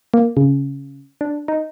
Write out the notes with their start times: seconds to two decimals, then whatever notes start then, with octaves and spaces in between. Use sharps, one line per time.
0.14 A#3
0.37 C#3
1.21 D4
1.48 D#4